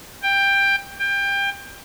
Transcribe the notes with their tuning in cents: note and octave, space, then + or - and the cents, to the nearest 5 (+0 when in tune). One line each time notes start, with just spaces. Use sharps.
G5 +15
G5 +25